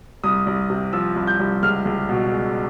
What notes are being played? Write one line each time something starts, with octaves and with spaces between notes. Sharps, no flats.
C2 D#6
C2
C3
F3 E6
C2
G6
C2
C#2 F6
C#2
B2
G#3